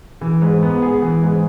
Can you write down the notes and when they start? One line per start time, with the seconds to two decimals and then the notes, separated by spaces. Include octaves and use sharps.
0.21 E3
0.42 G#2
0.63 B3
0.82 G#4
1.02 E3
1.23 G#2